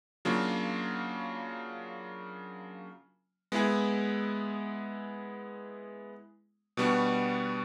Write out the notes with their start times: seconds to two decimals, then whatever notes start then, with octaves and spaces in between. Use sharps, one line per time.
0.25 C#3 F#3 A#3 D4 F4
3.52 G#3 B3 E4 G#4
6.77 B2 G3 B3 D4 F#4